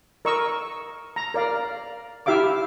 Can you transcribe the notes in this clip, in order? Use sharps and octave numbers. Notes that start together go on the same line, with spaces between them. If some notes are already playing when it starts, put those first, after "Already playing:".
A#4 D#5 C#6 E6
A#5
A#4 D5 F5
E4 G4 E5 F5 D6